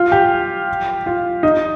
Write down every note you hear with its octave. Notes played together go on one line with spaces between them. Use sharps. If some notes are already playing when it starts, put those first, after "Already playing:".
Already playing: F4
G4
F4
D#4